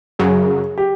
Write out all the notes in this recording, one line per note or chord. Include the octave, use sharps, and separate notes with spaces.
F#2 C#3 F#3 G#4
G4